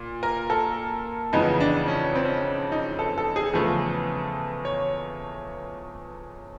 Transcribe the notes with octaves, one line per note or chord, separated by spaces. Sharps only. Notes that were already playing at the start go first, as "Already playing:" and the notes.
Already playing: A#2
A#4
A4
F2 C#3 E3 G#3 B3 D#4
D4
C#4
C4
C#4
D#4
A4
A4
G#4
E2 C#3 F3 A3 A4
C#5